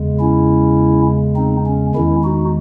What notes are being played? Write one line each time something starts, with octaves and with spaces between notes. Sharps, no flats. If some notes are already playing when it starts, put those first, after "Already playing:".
Already playing: E2 C#3 G#3
C#4 E4
C4 D#4
C#4
E2 D#3 G#3 C#4 E4
D#4 F#4